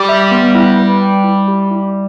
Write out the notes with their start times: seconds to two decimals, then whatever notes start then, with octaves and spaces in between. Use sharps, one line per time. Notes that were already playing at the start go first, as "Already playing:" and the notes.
Already playing: G3 G4
0.09 E5
0.31 B3
0.55 E4
0.79 B4
1.01 G5
1.24 E4
1.48 G4
1.71 E4